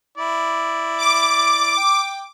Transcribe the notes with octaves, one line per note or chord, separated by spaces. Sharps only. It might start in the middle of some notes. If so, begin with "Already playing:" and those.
E4 D5
D6
G5